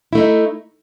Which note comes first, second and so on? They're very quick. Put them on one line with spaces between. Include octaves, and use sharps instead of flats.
E4 A3 D#4